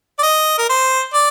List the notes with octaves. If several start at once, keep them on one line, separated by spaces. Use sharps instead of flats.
D5
D#5
A#4
C5
D5